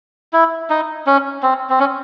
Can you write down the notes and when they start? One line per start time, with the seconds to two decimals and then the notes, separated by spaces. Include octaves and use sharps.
0.33 E4
0.70 D#4
1.06 C#4
1.43 C4
1.70 C4
1.80 C#4